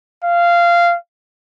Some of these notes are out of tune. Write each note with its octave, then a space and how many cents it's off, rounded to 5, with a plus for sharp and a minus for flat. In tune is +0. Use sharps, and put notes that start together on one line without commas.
F5 -15